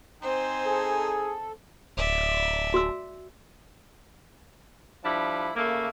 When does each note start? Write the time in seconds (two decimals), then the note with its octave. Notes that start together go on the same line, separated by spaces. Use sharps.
0.22 C4 D#4 C5 G#5
0.66 G#4 A4
1.97 D1 D5 E5
2.74 F#4 E6
5.04 F3 G3 D4 E4
5.56 C#3 A3 A#3